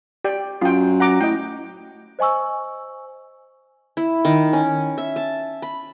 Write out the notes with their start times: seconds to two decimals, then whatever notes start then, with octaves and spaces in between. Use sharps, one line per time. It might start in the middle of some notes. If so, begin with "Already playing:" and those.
0.24 G4 D5 G5
0.61 F#2 F4 G5
1.00 F#5 A#5 D6
1.21 A2 D#5 G5
2.19 C5 D#5 G#5 C#6 E6
3.97 E4
4.25 D#3
4.53 C#4
4.98 E5
5.16 A5
5.62 B5